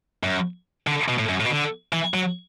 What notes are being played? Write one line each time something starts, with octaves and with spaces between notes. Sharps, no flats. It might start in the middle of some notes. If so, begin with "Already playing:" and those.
F#2
D3
B2
A2
F#2
A2
B2
D3
E3
F#3